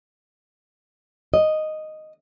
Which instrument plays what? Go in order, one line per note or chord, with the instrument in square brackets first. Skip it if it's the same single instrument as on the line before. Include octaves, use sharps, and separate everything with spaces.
[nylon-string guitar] D#5